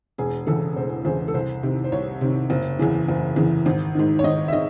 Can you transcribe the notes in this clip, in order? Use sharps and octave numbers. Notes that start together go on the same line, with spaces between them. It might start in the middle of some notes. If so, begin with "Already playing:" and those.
E1 G#4
E2 C#3 E3 A4
E1 C5
E2 C#3 E3 C5
A4
C2 C5
C3 D#3
C5
C2 C#5
C3 D#3
F#1
E2 C#3 E3
F#1
E2 C#3 E3
G#1
G#2 D#3
C#5
G#1 D#5
E5
D#3 D#5